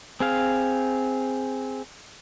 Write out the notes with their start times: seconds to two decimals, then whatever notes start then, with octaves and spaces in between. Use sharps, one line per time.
0.20 C4 G#4 F5